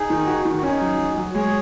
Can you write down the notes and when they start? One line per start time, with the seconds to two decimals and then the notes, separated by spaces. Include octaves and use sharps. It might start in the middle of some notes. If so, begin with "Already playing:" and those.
Already playing: D#4 G#4
0.10 D#3
0.27 F#4
0.45 D#3
0.56 F#4
0.63 C#4 D#4 G#4
0.81 F#3
0.99 F#3
1.17 F#3
1.34 G#3 G#4 C#5